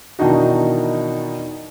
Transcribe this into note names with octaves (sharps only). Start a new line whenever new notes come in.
B2 D#3 E3 D4 D#4 F#4